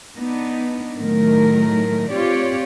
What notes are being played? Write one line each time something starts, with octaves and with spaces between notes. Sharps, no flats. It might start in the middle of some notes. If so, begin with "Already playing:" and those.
B3 D4 D#4
A2 D#3 F#3 A3 A#4
C4 F4 G4 C#5 D5